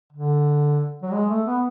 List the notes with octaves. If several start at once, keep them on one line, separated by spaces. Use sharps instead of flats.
D3
F#3
G#3
A3
B3